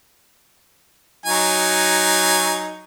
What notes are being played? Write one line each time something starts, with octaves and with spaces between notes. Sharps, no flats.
F#3 D#4 G#5